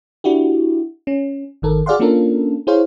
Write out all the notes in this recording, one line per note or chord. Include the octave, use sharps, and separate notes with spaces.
D4 E4 F#4 G4
C#4
G#1 D#3 A4 A#4
F#4 G#4 D5 F5 F#5 C6
A#3 C#4 D4 F4 A4 A#4
E4 G#4 C5 C#5 F5